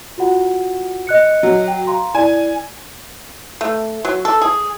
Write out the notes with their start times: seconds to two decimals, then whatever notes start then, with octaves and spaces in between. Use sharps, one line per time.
0.18 F4 F#4 F#5
1.07 D#5 F#6 C#7
1.43 F#3
1.68 G5
1.87 F5 A#5 C6
2.15 E4 D5 G#5
3.61 A3
4.05 F#3
4.25 A4
4.42 G#4